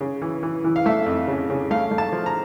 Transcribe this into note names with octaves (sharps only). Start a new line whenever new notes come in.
C#3
E3
E3
E3
F5
A3 E5
F2
C#3
C#3
A3 F5
A3
A5
F3
A#5